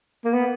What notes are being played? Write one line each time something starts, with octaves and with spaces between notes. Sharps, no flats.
A#3
B3